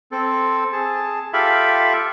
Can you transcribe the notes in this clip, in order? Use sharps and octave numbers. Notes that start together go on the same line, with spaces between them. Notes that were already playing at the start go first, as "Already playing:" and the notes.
C4 A4
G#4 A5
F4 G4 A4 E5 F5 B5